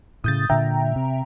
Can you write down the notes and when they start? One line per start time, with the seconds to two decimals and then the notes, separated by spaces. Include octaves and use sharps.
0.24 A2 C#3 D#6 G6 A6
0.50 A#2 D3 E5 G5 A#5
0.96 C3